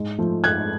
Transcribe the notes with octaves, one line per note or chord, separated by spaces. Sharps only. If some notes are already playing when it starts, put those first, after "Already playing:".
Already playing: G#2
F3 A3
G#2 F#6 G#6